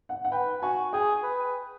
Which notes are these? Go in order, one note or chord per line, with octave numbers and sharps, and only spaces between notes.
F#5
F#5
B4 G5
F#4 G#5
G#4 G5
B4